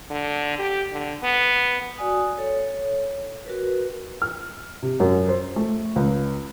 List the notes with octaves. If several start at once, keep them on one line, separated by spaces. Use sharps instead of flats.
D3
G4
D3
B3
F#4 D5 G#5 D#6
A4 C#5
F#4 A#4 B4
F6
C3
F#2
C5
A3
C#2